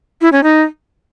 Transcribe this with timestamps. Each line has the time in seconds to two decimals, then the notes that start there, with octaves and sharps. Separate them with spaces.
0.21 E4
0.32 C#4
0.43 D#4